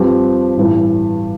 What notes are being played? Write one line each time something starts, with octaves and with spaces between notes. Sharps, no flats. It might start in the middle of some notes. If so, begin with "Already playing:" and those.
Already playing: G2 F3 C4 G4 B4
A1 G2 E3